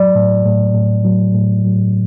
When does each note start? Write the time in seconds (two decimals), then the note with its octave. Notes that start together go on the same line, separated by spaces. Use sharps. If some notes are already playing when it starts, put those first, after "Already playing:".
Already playing: F#3 D5
0.15 A2
0.45 A2
0.75 A2
1.05 F#3
1.34 A2
1.65 F#3